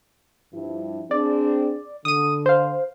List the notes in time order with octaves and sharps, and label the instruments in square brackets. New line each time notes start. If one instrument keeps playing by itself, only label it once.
[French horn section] G2 F3 E4
[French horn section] C4 D4 G#4 [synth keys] D5
[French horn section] D3 [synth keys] D#6 D#7
[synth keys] C5 F5